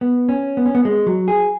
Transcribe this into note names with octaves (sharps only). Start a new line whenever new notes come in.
B3
C#4
B3
C#4
B3
G#3
F#3
G#4